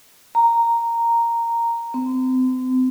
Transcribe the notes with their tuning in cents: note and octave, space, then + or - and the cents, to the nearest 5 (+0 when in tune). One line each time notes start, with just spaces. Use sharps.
A#5 -5
C4 -35